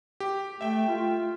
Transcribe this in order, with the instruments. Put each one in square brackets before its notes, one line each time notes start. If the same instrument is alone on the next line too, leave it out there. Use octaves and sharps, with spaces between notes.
[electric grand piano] G4
[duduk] A3 [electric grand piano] E5 G5
[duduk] F4